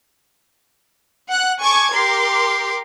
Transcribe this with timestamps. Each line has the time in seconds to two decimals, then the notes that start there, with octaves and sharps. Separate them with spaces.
1.29 F#5 F#6
1.61 A4 G#5 C#6 D6 G#6
1.96 G4 A#4 C6 D6